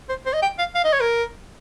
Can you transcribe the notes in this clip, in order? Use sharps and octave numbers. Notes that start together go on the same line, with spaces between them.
C5
C5
D#5
G5
F5
F5
D#5
C#5
A#4